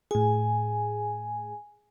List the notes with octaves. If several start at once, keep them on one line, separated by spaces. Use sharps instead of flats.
A2 G#4 G#5